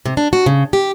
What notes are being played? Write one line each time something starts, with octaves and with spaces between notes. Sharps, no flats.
C3
D4
F#4
C#3
G4